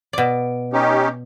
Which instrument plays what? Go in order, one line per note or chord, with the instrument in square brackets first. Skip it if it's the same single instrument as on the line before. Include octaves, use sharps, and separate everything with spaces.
[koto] B2 D5
[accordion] C#4 D#4 G4